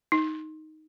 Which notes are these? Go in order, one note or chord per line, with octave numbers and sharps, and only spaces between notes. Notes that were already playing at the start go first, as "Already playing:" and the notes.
D#4